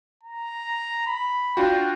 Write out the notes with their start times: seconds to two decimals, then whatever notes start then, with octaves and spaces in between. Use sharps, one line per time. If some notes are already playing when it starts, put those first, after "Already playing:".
0.23 A#5
1.07 B5
1.57 D4 F4 F#4 G5